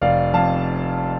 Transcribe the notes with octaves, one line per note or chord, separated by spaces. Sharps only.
F1 D5 F5
F2 F5 A5